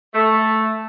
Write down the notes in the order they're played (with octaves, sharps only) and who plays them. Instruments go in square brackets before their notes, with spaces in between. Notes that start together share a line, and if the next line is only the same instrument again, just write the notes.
[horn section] A3